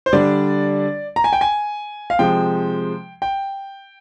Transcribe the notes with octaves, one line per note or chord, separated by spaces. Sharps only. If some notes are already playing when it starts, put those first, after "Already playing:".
C5
D3 G3 D4 D5
A#5
G#5
G5
G#5
F5
C3 F3 G#3 G5
G5